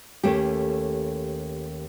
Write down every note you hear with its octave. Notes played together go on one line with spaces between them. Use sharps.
D#2 A3 C#4 G4